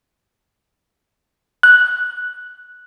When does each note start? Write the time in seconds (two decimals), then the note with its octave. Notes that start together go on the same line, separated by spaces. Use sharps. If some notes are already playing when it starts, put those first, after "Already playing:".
1.63 F#6